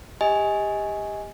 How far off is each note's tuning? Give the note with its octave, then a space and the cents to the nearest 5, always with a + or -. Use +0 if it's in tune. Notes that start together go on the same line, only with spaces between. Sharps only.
G4 +25 D#5 +25 G#5 +0